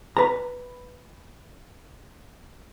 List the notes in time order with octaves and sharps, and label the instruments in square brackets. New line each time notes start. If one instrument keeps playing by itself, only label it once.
[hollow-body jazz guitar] B4 A#5